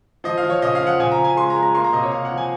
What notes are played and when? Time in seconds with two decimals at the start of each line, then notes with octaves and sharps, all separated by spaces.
0.24 F3 D#5
0.38 F5
0.43 F3
0.50 C#5
0.62 C#3 D#5
0.75 F5
0.81 F3
0.87 F#5
1.00 C#3 G#5
1.12 A#5
1.19 C#3
1.24 G#5
1.37 G#3 C6
1.50 A#5
1.56 G#3
1.63 A#5
1.75 A#3 C6
1.84 A#5
1.93 C3 D#5
2.03 C#5
2.12 C3 F5
2.25 F#5
2.31 F3
2.37 G#5